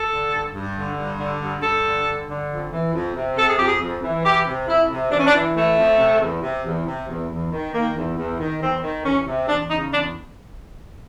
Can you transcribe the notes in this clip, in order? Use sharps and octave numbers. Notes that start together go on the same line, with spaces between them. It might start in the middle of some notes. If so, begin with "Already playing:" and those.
Already playing: A4
D3
G2
G2
D3
G2
D3
G2
G2 A4
D3
G2
D3
F2
E3
F2
C3
C3 A4
G#4
F2 G4
G#4
F2
E3
E3 G4
C3
F2 E4
C3
E3 D4
C#4
D4
E3
E3 A3
F2
C3
E2
C3
E2
C3
E2
E2
D#3
D#3 A#3
E2
E2
D#3
E2 C4
D#3
E2 C#4
C3
E2 D4
C#3 D#4
E2 D4